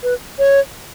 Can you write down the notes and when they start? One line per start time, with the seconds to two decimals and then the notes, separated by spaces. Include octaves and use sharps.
0.03 B4
0.39 C#5